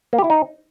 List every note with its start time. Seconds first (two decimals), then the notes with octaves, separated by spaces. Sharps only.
0.13 A#3
0.18 G4
0.24 E4
0.30 D#4